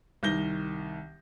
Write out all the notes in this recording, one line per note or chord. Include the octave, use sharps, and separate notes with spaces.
C2 D#3 G6 A#6 G7